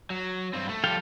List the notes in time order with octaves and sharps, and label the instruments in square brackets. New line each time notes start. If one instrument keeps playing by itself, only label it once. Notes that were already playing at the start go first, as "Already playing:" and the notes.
[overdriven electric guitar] F#3
G2 C4
A3
[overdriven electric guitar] F3 G3 [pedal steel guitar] A4 F5 G5